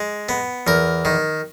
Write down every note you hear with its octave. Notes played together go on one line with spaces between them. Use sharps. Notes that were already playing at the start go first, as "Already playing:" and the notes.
Already playing: G#3
B3
E2 A#4
D#3